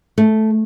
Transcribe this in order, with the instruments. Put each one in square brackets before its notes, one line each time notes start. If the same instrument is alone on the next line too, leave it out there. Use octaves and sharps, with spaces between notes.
[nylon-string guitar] A3